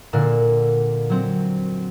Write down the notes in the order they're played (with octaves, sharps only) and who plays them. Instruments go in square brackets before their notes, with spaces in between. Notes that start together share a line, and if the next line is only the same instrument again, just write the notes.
[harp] A#2 D3 A#3 A#4 F#5 E7
F#3 C4